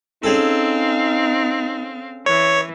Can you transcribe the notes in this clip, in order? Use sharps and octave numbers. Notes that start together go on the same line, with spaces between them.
C4 C#4 D#4 G#4 A4 F5
E3 C#5